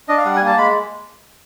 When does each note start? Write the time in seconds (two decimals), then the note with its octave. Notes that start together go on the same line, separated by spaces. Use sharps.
0.08 D4 D#5
0.18 F5
0.25 G3 F#5
0.36 A#3 G#5
0.47 A5
0.57 G#3 B5